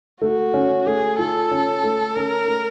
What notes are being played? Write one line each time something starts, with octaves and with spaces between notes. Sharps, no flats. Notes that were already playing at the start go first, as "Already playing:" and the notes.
A3 F#4
C#4
A3 G#4
F4 A4
C#4
A3
C#4 A#4
A3